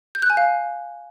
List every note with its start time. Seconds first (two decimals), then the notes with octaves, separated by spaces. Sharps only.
0.15 G6
0.22 F#6
0.30 G#5
0.37 F5